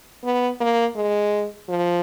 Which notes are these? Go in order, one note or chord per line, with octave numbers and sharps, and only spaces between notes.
B3
A#3
G#3
F3